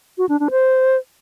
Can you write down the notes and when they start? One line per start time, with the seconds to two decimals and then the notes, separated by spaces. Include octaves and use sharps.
0.18 F#4
0.29 D4
0.40 D4
0.51 C5